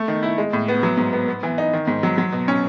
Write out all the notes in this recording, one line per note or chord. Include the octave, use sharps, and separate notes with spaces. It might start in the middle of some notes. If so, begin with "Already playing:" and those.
Already playing: A3
D#3
E4
G#3
A2
B3
F#3
G#2
B3
B3
E3
D#4
D#3
G#2
F#3
F#3
B2
C#4